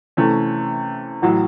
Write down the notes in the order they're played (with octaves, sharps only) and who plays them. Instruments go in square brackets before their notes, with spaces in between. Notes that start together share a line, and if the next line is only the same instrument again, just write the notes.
[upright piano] C3 E3 A3 C#4
A1 A2 F#3